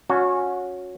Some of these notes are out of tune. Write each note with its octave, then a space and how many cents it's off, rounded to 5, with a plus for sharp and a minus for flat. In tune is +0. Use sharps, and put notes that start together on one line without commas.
C#4 +0 F#4 -25